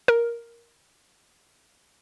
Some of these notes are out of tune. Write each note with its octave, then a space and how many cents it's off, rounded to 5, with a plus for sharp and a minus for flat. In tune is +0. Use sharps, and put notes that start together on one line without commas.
A#4 +5